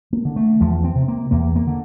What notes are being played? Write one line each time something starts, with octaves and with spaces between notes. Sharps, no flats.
A#3
D3
A3
E2 F3
C4
C3
A#3
E2 A#3
A#3
D3